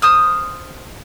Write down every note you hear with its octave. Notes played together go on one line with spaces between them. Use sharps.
C5 D#6 F6